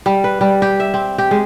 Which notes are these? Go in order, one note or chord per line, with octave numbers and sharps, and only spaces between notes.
G3
B4
G3
G4
E5
C4
G4
G#3